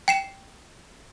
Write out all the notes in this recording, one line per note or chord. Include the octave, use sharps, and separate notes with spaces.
G5 C7 E7